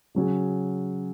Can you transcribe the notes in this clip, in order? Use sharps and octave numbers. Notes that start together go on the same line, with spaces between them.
C#3 F#3 C#4 G#4